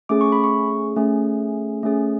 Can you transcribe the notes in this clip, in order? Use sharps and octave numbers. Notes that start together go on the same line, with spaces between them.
A3 C#4 G#4 D6
C#6
B5
C#6
A3 C#4 G#4
A3 C#4 G#4